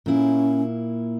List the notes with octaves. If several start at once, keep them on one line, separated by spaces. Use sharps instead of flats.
A#2 A#3 C#4 E4